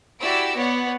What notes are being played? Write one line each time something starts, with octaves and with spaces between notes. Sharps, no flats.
E4 F#4 G4 D5 E6 D7
B3 C#5 D5 F#5